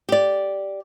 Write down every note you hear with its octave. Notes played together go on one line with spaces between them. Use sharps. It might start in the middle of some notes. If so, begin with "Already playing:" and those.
G4 D5